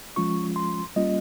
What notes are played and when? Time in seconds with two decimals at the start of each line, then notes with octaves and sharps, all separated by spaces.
0.16 F3 G#3 C#4 F4 C#6
0.56 C6
0.96 G3 A#3 C#4 F4 D#5